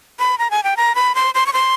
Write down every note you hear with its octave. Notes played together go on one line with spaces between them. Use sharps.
B5
A#5
G#5
G5
A#5
B5
C6
C6
C#6
C6